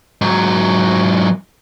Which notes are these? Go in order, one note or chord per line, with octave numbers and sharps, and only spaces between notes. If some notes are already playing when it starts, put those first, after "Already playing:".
G#2 F#3